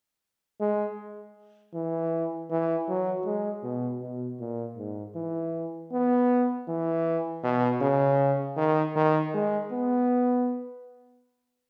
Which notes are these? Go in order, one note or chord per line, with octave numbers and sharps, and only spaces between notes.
G#3
E3
E3
F#3
G#3
B2
B2
A#2
G#2
E3
B3
E3
B2
C#3
D#3
D#3
G#3
B3